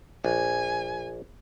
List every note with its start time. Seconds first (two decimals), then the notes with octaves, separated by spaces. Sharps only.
0.25 A#1 G#5